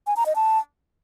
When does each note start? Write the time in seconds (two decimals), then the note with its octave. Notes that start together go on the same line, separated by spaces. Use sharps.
0.07 G#5
0.16 A#5
0.26 D#5
0.36 A5